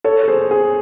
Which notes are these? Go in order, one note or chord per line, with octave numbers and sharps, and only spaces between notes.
A4 C#5
A4
G#4 C5
G#4 C5